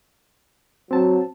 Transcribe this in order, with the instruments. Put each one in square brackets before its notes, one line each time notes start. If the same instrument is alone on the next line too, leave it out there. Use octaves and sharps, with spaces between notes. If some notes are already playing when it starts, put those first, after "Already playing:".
[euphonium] F#3 [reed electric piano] C4 A5